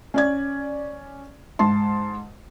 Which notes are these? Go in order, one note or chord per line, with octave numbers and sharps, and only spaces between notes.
C#4 D5 G#6
G#2 A5 C6